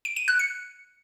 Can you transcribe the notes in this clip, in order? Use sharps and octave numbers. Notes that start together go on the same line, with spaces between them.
D7
D#7
F#6
C#7